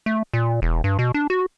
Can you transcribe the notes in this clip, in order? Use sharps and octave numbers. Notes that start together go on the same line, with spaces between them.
A3
A#2
E1
G2
B2
D4
F#4